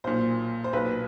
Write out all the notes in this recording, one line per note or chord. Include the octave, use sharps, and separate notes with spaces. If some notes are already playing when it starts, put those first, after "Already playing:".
B1 A#2 C5
C5
B1 A#2 B4